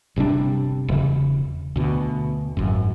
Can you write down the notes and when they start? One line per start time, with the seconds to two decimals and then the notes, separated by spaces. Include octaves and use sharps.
0.16 G1 C3 G3 D4
0.89 E1 C#3
1.76 D2 B2
2.57 G#1 F#2